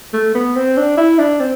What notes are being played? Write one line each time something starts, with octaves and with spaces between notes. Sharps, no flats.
A3
B3
C4
D4
E4
D4
C4